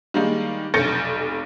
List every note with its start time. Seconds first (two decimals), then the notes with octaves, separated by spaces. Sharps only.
0.14 D#3 G3 G#3 A#3 D#4
0.74 F1 B1 G6 A6 A#6 C#7